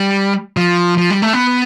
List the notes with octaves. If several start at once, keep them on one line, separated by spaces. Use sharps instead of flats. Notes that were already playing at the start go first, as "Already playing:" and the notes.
Already playing: G3
F3
F3
G3
A3
B3